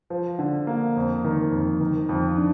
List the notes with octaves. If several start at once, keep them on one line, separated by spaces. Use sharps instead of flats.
F3
D3
A#3
F2
D#3
F2
D#3
F2
D4